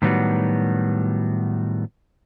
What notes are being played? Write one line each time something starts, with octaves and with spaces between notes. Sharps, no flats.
A2 D#3 F#3 G3 B3 F#4